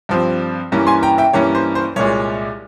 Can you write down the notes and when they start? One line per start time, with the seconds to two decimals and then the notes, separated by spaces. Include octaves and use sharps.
0.09 G2 F3 C4
0.72 G2 E3 A#3 C#4
0.87 G#5 C6
1.03 G5 A#5
1.18 E5 G5
1.33 G2 E3 A#3 C#4 C#5
1.55 C5
1.75 C5
1.96 C2 A#2 G#3 C#5